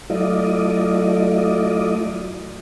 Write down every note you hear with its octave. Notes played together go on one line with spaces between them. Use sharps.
F#3 A3 E4 F4 D5 D#5